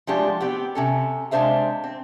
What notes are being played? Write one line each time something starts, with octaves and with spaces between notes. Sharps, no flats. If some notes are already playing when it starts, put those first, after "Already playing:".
F3 G#3 A3 D4 G4
B3 C4 G4
C3 C#4 A4
C3 G#3 D4 C5 E5 F5
C4